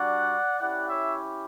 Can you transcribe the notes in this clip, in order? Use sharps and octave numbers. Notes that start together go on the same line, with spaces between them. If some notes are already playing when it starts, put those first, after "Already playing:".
Already playing: G3 D4 F#4 D5 F#5
C#4 E4 G4 D5 F#5
C#5 E5